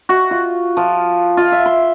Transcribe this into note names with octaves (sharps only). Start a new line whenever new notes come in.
F#4
F4
F3
F4
E5
C6